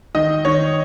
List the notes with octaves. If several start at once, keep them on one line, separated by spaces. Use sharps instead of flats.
D#3 D#5
D#3 C#5